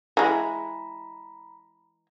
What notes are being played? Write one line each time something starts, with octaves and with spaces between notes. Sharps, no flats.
E3 G#3 A#5 B5